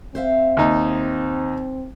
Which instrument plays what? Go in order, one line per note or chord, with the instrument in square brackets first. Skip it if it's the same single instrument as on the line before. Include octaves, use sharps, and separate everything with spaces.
[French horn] C4 [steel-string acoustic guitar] C5 E5 F5
[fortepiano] D#2 D#4